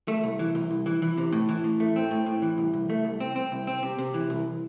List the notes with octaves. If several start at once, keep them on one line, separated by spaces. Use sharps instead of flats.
A3
C2
E3
C2
C2
E3
E3
C3
A2
E3
A2
A3
C4
A2
A2
E3
C2
C2
A3
C2
C4
C4
C2
C4
C3
C3
E3
C2